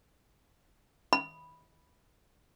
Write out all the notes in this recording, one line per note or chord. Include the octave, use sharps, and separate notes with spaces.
B5